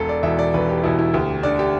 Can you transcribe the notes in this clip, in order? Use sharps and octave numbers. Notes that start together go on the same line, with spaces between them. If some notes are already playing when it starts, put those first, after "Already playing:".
Already playing: E1 A4
D5
E2 B2 E5
D5
E1 B4
G4
E2 B2 E4
E4
D2 G4
D3 D5
G4